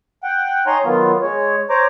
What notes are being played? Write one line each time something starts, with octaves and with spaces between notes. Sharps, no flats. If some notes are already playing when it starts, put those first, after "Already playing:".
F#5 G5
D#4 C#5 G#5 A#5 C6
D#3 F#3 B3 F4
G#3 C#5
C5 C#5 A#5 D6